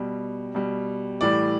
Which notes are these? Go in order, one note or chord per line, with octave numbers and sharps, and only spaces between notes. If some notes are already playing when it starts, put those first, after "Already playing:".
Already playing: B2 G3
B2 G3
A2 E3 G3 D5